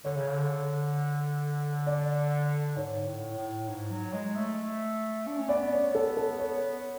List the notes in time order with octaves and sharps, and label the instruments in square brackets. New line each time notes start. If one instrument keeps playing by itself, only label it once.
[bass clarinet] D3 [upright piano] C#5
[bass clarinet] C#3
D3
[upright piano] D5
[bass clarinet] G#2 [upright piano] C#5
[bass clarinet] A2
A2
G#2
F#3
G#3
A3
D4
C#4
[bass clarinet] B3 [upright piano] D5
[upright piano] C#5
A4
A4
C#5